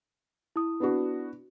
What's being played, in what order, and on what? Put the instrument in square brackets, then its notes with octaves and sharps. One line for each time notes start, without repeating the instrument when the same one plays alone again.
[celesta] E4 D#6
[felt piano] B3 D4 F#4